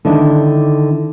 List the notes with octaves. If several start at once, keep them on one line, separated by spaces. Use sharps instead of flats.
D3 D#3 D4 E4